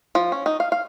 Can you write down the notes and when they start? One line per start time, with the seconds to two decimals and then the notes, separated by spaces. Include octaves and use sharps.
0.15 F3
0.32 C#4
0.46 D#4
0.60 F5
0.72 F5